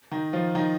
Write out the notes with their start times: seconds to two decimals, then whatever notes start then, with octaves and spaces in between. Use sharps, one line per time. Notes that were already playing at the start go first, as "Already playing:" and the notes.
0.11 D#3 D#4
0.33 F3 F4
0.55 D#3 D#4